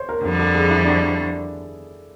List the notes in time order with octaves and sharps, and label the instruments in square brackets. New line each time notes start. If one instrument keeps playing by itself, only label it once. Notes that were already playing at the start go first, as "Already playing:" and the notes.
Already playing: [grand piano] C5 C#5
A#4
[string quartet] F2 D3 G3 [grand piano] A4
[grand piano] A4
G#4
E4
D4